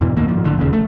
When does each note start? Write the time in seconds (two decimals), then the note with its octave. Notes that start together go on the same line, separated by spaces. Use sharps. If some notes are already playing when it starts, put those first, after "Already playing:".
0.01 F2 G#2 B2 E3
0.16 D#1 D2 D#3 A#3
0.28 G#2 F3
0.44 A1 D3
0.58 E1 D#2 C#3
0.73 A3